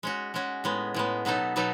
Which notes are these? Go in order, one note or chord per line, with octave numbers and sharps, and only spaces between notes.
G#3 C#4 F#4
G#3 C#4 F#4
A2 G#3 B3
A2 G#3 B3
B2 F#3 B3 D#4 A4
B2 F#3 B3 D#4 A4